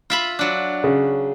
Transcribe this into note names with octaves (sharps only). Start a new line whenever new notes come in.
F4 E5 B5
F#3 D4
C#3